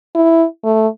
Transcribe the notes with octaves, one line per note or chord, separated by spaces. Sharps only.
E4
A3